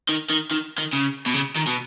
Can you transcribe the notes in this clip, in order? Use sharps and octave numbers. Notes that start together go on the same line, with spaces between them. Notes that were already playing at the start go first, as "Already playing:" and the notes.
D#3
D#3
D#3
D#3
C#3
B2
C#3
D#3
B2